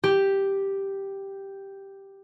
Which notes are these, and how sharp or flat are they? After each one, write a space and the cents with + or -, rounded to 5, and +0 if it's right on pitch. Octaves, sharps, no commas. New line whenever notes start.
G4 +0